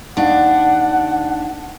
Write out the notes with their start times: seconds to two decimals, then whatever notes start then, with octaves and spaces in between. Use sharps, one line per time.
0.17 D#2 D4 F#5